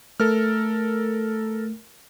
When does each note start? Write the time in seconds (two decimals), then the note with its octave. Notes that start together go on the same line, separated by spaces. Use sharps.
0.20 A3 A4 A#4 F6